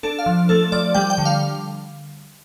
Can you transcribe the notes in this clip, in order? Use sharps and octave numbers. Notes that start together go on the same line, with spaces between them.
D4 A4
F5
F3
A3 A4
F3 D5
G3 G5
G5
D3
F5